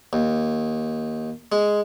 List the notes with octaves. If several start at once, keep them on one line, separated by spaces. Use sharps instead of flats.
D#2
G#3